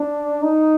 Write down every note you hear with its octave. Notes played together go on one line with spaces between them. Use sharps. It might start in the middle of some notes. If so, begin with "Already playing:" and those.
Already playing: D4
D#4